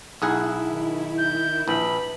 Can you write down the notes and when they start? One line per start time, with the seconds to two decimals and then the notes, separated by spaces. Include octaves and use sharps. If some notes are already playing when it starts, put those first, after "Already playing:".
0.22 B1 E4 G#4 F#5
0.72 D#3
1.18 G6
1.68 A#1 B4 B5